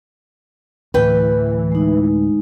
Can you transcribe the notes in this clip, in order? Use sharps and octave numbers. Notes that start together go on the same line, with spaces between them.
D2 A2 E3 B4 G5
G#3 D#4